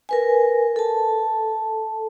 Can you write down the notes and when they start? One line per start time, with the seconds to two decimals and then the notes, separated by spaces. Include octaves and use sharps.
0.09 A#4 B4 G#5
0.76 A4 A5